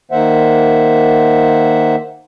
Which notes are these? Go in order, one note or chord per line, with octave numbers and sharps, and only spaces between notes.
D#3 A#3 C5 E5 F#5